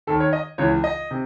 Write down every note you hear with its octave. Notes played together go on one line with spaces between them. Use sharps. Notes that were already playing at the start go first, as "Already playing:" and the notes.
D#2 D#3 A4
C#5
D#5
C#2 C#3 E3 C#5
D#5
C3